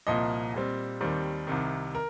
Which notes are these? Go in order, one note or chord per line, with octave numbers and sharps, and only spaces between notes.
C2 A#2 F3 A#3 D#5
A#2 G3 C4
D#2 D#3 G3 C4
C2 C3 D#3
A#4